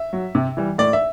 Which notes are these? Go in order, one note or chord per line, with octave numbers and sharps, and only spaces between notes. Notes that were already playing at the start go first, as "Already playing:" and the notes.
Already playing: E5
F#3
C3
E3 G3
A2 D5
E5